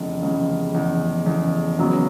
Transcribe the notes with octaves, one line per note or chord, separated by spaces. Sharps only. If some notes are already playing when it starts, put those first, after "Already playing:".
Already playing: F1 E2 C#3
F1 E2 C#3
F1 E2 C#3
F1 E2 C#3
E1 E2 C#3 F#3 B3